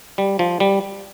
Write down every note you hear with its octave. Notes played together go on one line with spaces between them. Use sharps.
G3
F3
G3